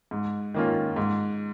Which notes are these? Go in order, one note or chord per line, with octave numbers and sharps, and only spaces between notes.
G#2
D#3 A#3 C#4 F4
G#2